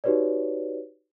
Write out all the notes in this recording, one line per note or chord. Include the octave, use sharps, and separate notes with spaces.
D#4 F#4 G4 B4 C#5 D5